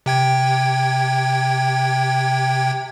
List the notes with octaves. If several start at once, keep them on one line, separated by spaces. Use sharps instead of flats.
C3 G5 G#6